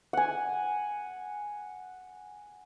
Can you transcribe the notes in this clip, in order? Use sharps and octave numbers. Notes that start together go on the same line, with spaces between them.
F#5 G#5